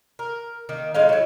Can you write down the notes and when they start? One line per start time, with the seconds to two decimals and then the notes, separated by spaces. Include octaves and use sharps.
0.19 A#4
0.69 D#3 A#3
0.94 A2 G#3 D#4 F5
1.09 F#3 E4